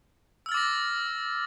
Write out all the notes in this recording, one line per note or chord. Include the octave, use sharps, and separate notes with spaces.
D6 E6 F6 A6 A#6